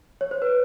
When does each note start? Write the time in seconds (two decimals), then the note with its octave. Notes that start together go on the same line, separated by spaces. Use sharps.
0.21 C#5
0.31 C5
0.42 B4